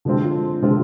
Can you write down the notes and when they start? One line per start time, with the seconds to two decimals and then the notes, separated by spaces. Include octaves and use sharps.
0.05 D3 F3 G#3 C4 F4
0.62 D3 F3 G#3 C4 F4